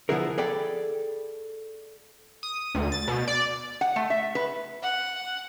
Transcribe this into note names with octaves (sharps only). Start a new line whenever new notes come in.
D3 F3 B3 E4 G#4 A#4
G#4 A4 D5 G5 B5
D#6
D2
A6
B2
D5
F#5
A3
E5
B4
F#5